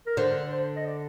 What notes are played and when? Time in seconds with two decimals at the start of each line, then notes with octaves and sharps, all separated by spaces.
0.07 A#4
0.17 D3 C5
0.51 C5
0.76 D#5
0.86 D5